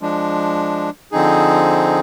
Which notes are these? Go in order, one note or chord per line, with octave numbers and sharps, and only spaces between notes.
F3 G#3 D4
D3 F3 C4 D#4 G#4